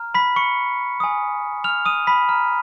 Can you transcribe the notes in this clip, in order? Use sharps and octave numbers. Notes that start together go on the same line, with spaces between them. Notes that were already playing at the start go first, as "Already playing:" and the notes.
Already playing: A#5 F6
B5 B6
C#6 C#7
G#5 B5 D#6
F6 F7
D#6 D#7
B5 B6
A#5 F6